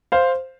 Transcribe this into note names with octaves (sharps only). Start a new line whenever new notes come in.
C5 F5